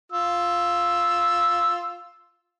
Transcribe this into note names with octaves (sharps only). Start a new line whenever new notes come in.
F4 E6